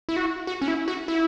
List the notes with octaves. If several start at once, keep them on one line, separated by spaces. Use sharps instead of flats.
E4
F#4
F#4
C#4
E4
F#4
E4